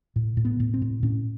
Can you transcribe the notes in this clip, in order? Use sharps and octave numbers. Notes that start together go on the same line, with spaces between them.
A2
A2
B3
A2
C4
A2
A2 C#4